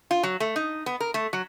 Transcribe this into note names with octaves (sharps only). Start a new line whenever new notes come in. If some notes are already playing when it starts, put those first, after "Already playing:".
F4
F#3
A3
D#4
B3
A#4
A3
F#3